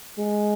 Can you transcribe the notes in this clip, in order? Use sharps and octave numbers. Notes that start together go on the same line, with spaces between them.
G#3